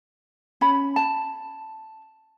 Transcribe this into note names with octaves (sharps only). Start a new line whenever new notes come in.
C#4 B5
A5